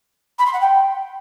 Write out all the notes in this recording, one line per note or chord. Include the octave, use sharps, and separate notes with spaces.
B5
C6
F#5
G5